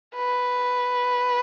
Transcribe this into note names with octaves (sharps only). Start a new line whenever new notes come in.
B4